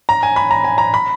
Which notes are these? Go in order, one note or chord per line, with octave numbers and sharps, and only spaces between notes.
A#5
G#5
B5
A#5
G#5
A#5
B5